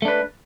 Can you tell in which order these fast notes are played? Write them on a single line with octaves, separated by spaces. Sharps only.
A3 D4 B4